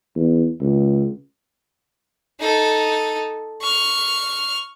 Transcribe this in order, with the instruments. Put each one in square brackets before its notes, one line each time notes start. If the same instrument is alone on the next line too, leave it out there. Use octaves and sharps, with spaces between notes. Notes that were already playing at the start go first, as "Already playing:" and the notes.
[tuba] E2
C#2
[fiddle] D#4 A4
C#6 F6